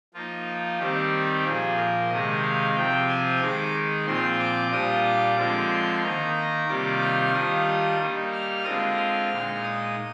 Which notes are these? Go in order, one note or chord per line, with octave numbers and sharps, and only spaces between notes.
F3 A#3 D#4 F4
D#3 G3 C4 G4
A#2 F3 A#3 G#4
A#4
C3 D#3 G#3 D#5
F5
C3 F3 C4 F4 G5
G#5
D#3 G#3 D#4 D6
A#2 F3 C4 F4 C6
D6
A#2 G3 D4 F4 D#6
D6
D3 F3 G#3 C4 F4
C6
D#3 A#3 D#4 A#5
C3 D#3 G3 A#3 F4 D6
F6
D#3 G3 D4 F4 D#6
G3 A#3 D#4
F6
D3 G#3 C4 F4 D#6
F6
A#2 G#3 D#4
D#6